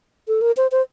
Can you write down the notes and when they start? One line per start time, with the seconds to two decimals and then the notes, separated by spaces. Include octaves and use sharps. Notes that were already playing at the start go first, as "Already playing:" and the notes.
0.28 A4
0.41 A#4
0.57 C5
0.72 C5